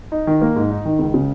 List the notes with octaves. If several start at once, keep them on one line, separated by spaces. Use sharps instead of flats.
D#4
D#3
A#3
G#2
D#4
D#3
C#2
C#3